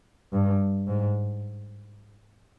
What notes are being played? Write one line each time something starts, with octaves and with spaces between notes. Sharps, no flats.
G2
G#2